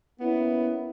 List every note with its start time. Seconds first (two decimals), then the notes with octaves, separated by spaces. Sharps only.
0.20 A#3 B3 C#4 E4